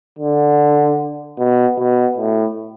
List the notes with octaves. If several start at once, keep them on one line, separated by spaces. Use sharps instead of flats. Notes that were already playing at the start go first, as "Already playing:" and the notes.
D3
B2
B2
A2